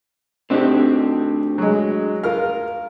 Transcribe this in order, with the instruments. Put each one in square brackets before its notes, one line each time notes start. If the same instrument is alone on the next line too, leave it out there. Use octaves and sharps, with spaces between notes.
[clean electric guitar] A2 D4 F#4 [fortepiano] C4 D#4 G4
[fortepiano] F#3 G#3
F4 A#4 F6